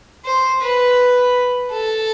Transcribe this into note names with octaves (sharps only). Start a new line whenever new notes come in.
C5
B4
A4